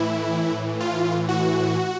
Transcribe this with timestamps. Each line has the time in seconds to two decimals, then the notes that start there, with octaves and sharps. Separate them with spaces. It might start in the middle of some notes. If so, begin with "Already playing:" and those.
Already playing: A2 E3 E4
0.80 F4
1.28 F#4